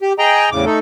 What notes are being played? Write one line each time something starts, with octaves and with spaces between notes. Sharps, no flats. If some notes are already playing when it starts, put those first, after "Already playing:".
G4
G#4 D#5 G5 A#5
E2 A2 C#3 D6
A3 D#4 A4